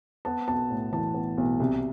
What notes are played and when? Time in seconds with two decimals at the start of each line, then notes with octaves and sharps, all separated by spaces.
0.25 B3 A5
0.48 B1 A5
0.71 A2
0.92 E3 A5
1.14 B3
1.38 B1
1.60 C2